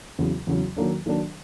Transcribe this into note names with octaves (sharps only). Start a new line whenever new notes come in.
E2 C#3 F#3
E2 C#3 F#3
D#3 F#3 A#3 D4
D#3 F#3 A#3 D4